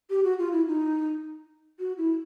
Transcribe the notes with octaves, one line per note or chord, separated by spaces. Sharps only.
G4
F#4
F4
E4
D#4
F#4
E4